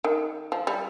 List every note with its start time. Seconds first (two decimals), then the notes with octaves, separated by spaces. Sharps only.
0.04 D#3
0.52 F3
0.67 G3